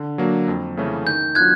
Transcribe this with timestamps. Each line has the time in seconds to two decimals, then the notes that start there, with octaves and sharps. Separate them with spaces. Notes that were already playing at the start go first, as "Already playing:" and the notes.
Already playing: D3
0.18 F#3 A#3 D4
0.48 F2
0.77 C#3 E3 A3 C#4
1.06 D#3 G6
1.35 F#3 B3 D4 F4 F#6 G#6